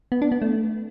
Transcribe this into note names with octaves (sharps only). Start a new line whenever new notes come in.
B3
D4
B3
A3